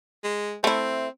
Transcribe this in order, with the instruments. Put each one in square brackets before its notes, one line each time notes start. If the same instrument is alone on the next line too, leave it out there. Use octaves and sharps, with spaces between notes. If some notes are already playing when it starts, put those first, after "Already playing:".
[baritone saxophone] G#3
[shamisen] A3 E4 [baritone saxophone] C4